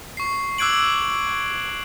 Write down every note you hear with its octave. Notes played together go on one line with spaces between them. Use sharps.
C#6 C7
D6 E6 F#6 G#6 D7 F#7